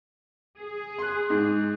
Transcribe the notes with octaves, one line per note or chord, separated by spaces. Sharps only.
G#4
C6 F#6
G#2